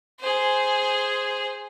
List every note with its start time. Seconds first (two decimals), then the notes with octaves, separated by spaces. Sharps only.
0.20 G#4 C5